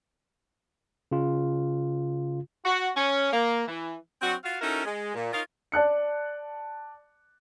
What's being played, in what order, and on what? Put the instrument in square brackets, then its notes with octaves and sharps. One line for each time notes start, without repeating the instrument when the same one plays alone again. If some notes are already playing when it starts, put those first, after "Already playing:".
[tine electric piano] C#3 F4
[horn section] F#4
C#4
A#3
E3
[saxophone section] F#3 C4 D4 F#4
F4 F#4 F5
C#4 D#4 E4 F#4 A4 A#4
G#3
A#2
D#4 F4 A#4 C#5 D#5 F5
[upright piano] D5 A5 F#6 C#7